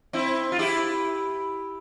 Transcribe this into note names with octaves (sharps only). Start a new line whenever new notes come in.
C4 E4
F4
E4 G4